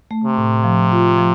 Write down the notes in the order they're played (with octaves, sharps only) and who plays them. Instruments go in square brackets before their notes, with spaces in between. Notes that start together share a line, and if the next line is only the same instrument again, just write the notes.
[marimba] A3
[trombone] C3
[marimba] A2
F3
F4
F3